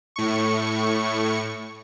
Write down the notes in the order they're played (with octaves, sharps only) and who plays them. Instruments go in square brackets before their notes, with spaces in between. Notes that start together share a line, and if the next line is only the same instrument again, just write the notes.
[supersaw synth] A2 C#6